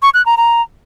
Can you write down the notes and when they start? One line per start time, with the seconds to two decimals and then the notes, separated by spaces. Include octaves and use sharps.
0.03 C#6
0.14 F#6
0.26 A#5
0.37 A#5